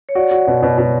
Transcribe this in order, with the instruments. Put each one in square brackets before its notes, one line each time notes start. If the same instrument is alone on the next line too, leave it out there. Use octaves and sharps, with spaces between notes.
[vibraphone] C#5
[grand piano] F#4 [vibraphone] D5
[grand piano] F#4
B2
B2
B2